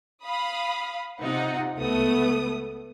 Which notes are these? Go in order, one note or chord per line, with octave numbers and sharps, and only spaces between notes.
F5 B5 D#6
C3 D#4 F4 F#5
C#2 A3 B3 D#6